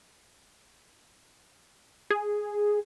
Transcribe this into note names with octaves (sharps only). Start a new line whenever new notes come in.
G#4